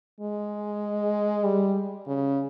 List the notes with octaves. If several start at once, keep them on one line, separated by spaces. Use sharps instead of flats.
G#3
G3
C#3